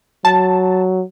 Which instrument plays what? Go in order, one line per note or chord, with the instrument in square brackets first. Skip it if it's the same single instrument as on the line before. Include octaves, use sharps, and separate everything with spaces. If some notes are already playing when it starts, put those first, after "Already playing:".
[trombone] F#3 [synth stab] A5